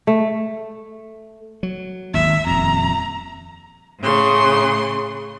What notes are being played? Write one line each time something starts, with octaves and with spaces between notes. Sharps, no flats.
A3
F#3
G#1 D#2 E5
D#1 F2 A#5
A2 C#3 C6